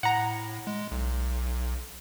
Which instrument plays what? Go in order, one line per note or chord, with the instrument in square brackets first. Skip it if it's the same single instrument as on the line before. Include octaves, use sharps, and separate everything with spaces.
[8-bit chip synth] A2 [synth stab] F#5 A#5
[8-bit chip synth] G#3
B1